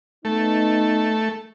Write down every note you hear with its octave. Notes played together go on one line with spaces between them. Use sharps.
A3 B3 D#4